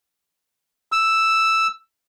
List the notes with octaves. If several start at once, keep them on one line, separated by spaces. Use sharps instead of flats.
E6